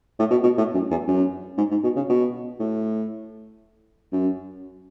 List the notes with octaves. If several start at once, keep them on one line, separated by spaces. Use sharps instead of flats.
A2
B2
B2
A2
F#2
E2
F#2
G#2
G#2
B2
C#3
B2
A2
F#2